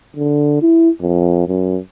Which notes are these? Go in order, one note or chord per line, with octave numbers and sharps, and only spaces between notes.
D3
E4
F2
F#2